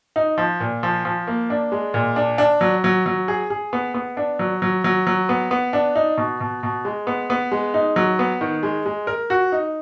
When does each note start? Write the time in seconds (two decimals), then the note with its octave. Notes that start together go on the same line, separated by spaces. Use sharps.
0.16 D#4
0.38 F3
0.60 A#2
0.83 F3
1.05 F3
1.27 A#3
1.50 D4
1.72 G#3
1.94 A#2
2.16 D4
2.38 D4
2.61 F#3
2.84 F#3
3.06 F#3
3.28 G#4
3.50 G#4
3.73 B3
3.94 B3
4.17 D4
4.39 F#3
4.62 F#3
4.84 F#3
5.07 F#3
5.29 B3
5.51 B3
5.73 D4
5.96 D#4
6.18 B2
6.41 B2
6.63 B2
6.85 G#3
7.07 B3
7.30 B3
7.52 G#3
7.74 D#4
7.96 F#3
8.19 B3
8.41 D#3
8.63 G#3
8.86 G#3
9.07 A#4
9.30 F#4
9.52 D#4